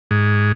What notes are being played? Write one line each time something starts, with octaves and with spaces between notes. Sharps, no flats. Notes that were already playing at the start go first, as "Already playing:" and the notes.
G#2